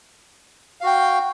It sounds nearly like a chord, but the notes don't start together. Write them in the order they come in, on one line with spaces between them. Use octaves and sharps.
F5 F#4 G5